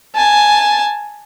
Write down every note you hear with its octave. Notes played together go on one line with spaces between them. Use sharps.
G#5 A5